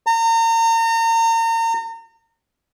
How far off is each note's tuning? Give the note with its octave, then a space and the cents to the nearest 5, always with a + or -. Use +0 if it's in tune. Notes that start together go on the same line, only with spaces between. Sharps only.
A#5 -35